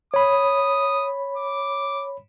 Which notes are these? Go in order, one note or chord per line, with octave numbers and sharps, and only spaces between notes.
C#5 B5 D#6
D6